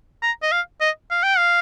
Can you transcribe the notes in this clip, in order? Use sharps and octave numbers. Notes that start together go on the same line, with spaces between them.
A#5
D#5
F5
D#5
F5
G5
F5